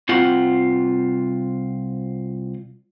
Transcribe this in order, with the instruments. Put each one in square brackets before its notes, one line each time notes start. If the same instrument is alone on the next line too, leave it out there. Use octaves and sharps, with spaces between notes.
[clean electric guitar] C2 C4 F4 F#5